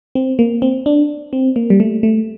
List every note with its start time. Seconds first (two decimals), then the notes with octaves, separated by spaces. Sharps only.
0.15 C4
0.39 A#3
0.62 C4
0.86 D4
1.33 C4
1.56 A#3
1.70 G3
1.80 A3
2.03 A3